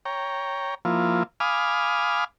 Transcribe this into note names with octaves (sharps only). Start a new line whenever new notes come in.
C#5 G5 A#5
F3 A#3 E4 F4
F5 G#5 B5 D6 D#6 F6